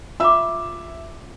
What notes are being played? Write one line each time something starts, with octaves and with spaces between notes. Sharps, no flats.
F4 E5 F5 D6 E6